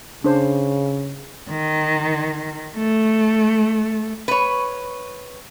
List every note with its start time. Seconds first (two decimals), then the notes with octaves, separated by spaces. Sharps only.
0.24 C#3 D4 C5
1.50 D#3
2.76 A3
4.28 B4 C#5